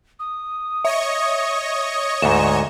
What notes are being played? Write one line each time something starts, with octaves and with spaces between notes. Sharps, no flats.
D#6
C#5 D#5 E5 C#6
D2 G#2 E5 E7